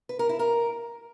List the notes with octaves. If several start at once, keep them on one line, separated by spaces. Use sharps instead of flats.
B4
A#4
E4
A#4